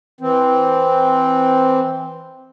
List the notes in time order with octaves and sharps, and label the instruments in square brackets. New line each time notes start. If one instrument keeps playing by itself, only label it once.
[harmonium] E3 C4